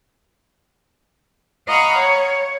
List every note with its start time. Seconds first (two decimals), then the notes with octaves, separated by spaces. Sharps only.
1.67 D#5 F5 F#5 A#5 B5 C#6
1.98 C#5